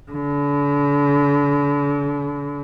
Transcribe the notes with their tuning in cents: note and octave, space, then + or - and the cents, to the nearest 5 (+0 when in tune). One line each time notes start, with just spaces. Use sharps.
D3 -40